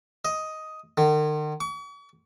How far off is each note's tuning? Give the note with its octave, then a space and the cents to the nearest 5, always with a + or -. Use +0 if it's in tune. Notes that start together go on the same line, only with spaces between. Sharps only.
D#5 +10
D#3 -45
C#6 +45